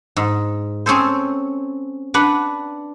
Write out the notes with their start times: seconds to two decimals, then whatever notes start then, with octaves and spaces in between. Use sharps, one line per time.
0.17 G#2
0.86 C4 C#4 G#4 A4 C5
2.14 D4 B4 F#5